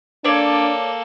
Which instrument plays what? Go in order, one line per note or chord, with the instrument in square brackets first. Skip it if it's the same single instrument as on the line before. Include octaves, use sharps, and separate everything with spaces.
[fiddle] A#3 A4 [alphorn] D4 [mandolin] C#5 D5